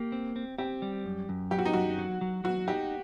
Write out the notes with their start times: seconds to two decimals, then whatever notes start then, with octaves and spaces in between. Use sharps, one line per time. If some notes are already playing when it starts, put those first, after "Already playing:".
Already playing: A#3 G4
0.12 C4
0.36 C4
0.58 C4 G4
0.82 G3
1.06 F#2
1.29 F#2
1.51 F#3 G4
1.59 F#4
1.65 D#4
1.73 F#2 F#4
1.99 F#3
2.21 F#3
2.44 F#3 F#4
2.67 D#4 G4